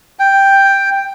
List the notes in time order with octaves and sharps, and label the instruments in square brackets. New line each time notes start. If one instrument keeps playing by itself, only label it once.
[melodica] G5